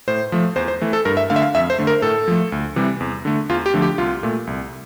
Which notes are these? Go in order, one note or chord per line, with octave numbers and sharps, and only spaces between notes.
A2 C5
F3 A3
E2 C5
C5
E3 A3
A4
G2 A#4
E5
D3 A3 F5
E5
F5
F2 E5
C5
D3 A3
A#4
A2 A4
F3 A3
D2
C3 E3 G3
E2
D3 A3
E2 F4
G4
D3 F3 A3
G4
C2 F4
A#2 A3
C2